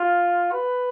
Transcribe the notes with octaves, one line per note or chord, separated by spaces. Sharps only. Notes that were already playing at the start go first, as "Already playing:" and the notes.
Already playing: F4
B4